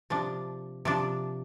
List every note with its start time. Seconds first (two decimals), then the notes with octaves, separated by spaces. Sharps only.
0.10 C3 F3 D4
0.85 C3 F3 D4